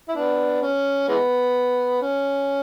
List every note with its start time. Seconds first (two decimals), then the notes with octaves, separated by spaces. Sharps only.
0.09 E4
0.15 B3 D4
0.62 C#4
1.09 E3 G#3 B3
2.02 C#4